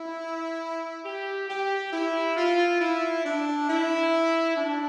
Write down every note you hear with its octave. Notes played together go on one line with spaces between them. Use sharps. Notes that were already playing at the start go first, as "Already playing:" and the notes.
Already playing: E4
G4
G4
E4
F4
E4
D4
E4
D4